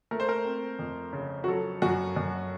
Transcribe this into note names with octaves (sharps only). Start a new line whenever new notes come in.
A3 A#4
C5
A#4
C4
F2
C#3
F#4
F#3 A4
F#2 F#4
F#2